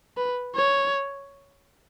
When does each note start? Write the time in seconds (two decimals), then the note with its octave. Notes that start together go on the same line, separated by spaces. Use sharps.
0.17 B4
0.56 C#5